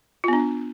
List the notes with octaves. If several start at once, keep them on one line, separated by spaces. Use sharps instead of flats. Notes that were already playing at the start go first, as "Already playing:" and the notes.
B3 D4 F4